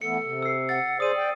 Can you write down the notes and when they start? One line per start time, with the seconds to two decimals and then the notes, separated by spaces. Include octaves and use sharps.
0.01 E3 A3 B3 A4 C#7
0.24 C3
0.42 E6 C7
0.69 F#5 A6
1.00 G#4 C5 D5 D#6 D#7
1.16 G5